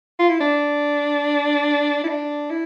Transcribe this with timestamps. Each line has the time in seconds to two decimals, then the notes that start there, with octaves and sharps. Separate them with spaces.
0.19 F4
0.29 E4
0.41 D4
2.04 E4
2.08 D4
2.50 E4